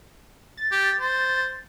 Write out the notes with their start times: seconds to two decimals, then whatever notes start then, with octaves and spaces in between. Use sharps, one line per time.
0.57 A6
0.72 G4
1.00 C5